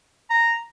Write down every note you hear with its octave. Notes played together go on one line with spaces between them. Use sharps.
A#5